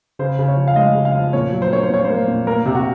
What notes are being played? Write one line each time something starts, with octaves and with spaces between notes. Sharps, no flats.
C#3 C5
C#3
C#5
F3
F5
G#3 D#5
C#3
F5
F3
A#2 C#5
F#3
C5
A#3 C#5
C5
A#2 C#5
A#3 C5
A#2
A#3 A#4
C3
F#4